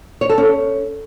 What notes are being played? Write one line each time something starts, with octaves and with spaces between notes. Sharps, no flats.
C#5
A4
C#4